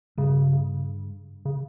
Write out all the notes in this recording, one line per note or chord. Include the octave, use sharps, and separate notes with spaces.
G2 C#3
C#3